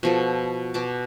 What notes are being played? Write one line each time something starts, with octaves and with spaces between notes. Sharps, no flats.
B2 F3 A4
B2 A5 D6